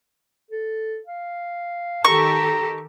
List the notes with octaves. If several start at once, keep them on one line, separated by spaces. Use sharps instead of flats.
A4
F5
D#3 G4 A4 A#5 C#6